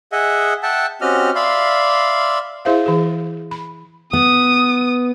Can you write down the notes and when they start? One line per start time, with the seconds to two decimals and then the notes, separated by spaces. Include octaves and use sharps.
0.12 G#4 D#5 E5 F#5
0.63 E5 F#5 G5 A5
1.01 C4 C#4 F#4 G4 D#5 F6
1.35 D5 E5 F5 B5 C6
2.65 E4 G#4 C5 E5 F5
2.86 E3 G#4
3.51 B5
4.13 B3 D#6